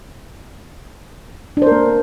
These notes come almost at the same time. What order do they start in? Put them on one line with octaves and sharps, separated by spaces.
D4 C5 A#4 A#3